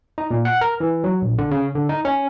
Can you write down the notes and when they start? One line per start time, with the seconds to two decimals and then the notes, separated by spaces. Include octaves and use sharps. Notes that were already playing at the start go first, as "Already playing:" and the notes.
0.18 D#4
0.31 A#2
0.45 F#5
0.61 A#4
0.80 E3
1.04 F#3
1.22 A#1
1.38 D3
1.51 C#3
1.75 D3
1.89 D#4
2.05 C#4